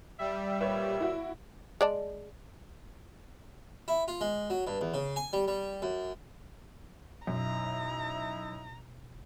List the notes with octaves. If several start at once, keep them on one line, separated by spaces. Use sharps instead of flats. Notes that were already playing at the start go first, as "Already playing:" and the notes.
G3 E5
A#2 B4 C#5 E5
E4 F#4
G#3 D5 A5
E4
F4
G#3
F#3
G2
E2
C#3
G#5
G3
G3
F#2
F#2 B2 D#4 E4 E5 A#5